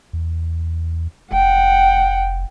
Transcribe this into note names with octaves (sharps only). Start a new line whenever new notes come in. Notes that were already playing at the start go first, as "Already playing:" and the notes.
E2
F1 F#5 G5